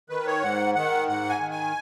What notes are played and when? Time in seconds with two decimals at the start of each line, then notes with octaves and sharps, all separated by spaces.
0.09 D#3 B4
0.27 C#5
0.42 G#2 F#5
0.75 D#3 F#5
1.08 G#2 F#5
1.30 G#5
1.40 D#3
1.51 G#5